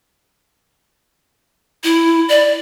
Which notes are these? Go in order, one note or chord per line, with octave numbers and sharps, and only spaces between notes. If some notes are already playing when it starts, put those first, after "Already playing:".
E4
D5